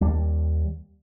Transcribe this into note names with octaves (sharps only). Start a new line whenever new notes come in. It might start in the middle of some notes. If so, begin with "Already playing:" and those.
D#2 G3